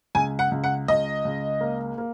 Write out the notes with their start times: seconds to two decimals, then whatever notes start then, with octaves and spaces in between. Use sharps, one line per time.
0.15 C#2 G#5
0.39 F#5
0.51 C#2
0.64 F#5
0.88 C#2 D#5
1.25 C#2
1.61 A#3
1.98 A#3